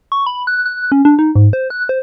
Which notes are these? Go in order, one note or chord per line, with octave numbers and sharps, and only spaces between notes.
C#6
B5
F#6
F#6
C#4
D4
D#4
G#2
C5
F#6
C5